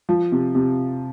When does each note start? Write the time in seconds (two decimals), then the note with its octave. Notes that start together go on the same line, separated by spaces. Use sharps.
0.09 F3
0.32 C3
0.55 C3